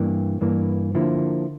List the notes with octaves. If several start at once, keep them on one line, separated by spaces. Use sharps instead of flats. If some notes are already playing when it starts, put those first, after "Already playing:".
Already playing: G2 E3 A#3
G2 E3 A#3
D3 F3 A#3 E4